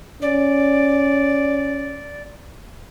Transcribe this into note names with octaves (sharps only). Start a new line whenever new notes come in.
C#4 D5